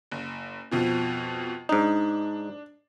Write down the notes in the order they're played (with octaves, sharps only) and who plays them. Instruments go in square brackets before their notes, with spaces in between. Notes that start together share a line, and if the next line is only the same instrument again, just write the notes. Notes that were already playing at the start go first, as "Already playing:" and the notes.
[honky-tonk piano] F#1
F2 B2 F3
[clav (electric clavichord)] G#2 D#4 [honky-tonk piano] D4